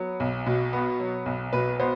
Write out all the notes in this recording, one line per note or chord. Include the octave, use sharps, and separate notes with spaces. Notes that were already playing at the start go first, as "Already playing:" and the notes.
Already playing: F#3 B3
B1
B2
B3
F#3
B1
B2 B4
B3 C5